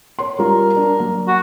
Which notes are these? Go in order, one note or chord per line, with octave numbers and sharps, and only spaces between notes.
C#5 C6
G3 F4 F#4 A#4
D4
F#3 A#3
F#4